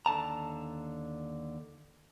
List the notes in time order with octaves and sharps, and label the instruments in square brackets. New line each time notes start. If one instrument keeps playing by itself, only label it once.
[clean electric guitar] D#2 D3 A5 A#5